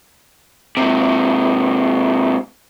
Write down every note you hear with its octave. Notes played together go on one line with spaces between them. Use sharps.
G#2 C3